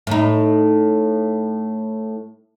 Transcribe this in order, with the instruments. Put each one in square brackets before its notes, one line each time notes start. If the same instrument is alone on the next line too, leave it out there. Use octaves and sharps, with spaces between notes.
[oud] A2 D#4